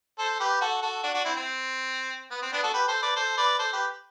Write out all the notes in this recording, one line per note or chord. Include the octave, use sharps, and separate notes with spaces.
A4 C5
G4 B4
F#4 A4
F#4 A4
D4 F#4
D4 F#4
C4 E4
C4
B3
C4
B3 D4
F#4 A4
G4 B4
A4 C5
B4 D5
A4 C5
B4 D5
A4 C5
G4 B4